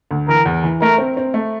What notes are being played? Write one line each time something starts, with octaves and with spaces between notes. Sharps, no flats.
D2
E3 A#4
E2
E3
A3 A#4
C4
C4
A3